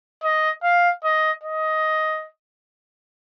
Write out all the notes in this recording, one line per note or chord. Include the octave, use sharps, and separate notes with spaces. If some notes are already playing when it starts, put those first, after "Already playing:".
D#5
F5
D#5
D#5